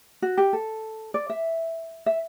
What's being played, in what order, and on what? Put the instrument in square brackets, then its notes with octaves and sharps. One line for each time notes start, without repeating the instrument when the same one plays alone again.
[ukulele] F#4
G4
A4
D5
E5
E5